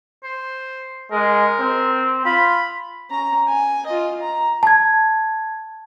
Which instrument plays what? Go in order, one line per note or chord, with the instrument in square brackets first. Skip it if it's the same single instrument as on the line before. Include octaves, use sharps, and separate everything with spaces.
[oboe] C5
[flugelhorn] G#3 [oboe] A#4
[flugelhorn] C4
[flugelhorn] F4 [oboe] B5
[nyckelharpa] C#4 A#5
G#5
F4 D#5
A#5
[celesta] A5 G#6